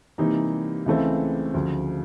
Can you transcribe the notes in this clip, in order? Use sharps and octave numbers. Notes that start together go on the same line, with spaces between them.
C3 E3 G3 A#3 D#4
C#2 C#3 E3 A3 C4
D2 C#3 F3